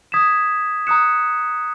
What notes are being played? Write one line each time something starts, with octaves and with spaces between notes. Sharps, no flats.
D#6 G#6 B6 E7
A#5 D#6 F#6 C#7 E7